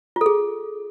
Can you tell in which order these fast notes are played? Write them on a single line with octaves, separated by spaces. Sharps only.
F4 A4 G#4